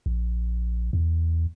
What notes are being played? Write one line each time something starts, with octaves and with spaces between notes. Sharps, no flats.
A#1
E2